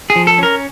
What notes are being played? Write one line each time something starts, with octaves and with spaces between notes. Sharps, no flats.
G#4
F3
A4
C#4 A#4